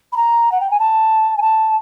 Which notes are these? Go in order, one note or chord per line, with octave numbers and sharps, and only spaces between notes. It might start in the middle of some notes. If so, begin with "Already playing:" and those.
B5
A#5
F#5
G5
G#5
A5
G#5
A5